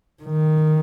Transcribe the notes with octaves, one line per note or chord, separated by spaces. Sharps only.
D#3